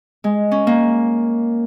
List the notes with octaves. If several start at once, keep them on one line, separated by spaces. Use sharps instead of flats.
G#3
C#4
A#3